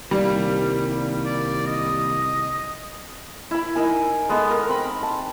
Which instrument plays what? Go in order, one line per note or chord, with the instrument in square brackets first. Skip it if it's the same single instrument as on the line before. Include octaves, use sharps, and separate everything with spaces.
[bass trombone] C2 [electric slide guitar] D#3 A#3 [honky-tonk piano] G3
[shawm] D5
D#5
[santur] E4 B5
D#4 A#4 G#5
G#3 B3 A4
A#4
C4 B5
A5